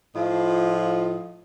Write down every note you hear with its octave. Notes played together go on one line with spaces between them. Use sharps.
A2 F3 F4 D#5